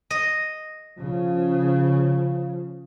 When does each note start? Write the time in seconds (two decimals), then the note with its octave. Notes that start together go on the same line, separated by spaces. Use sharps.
0.10 D#5
0.99 C#3 F3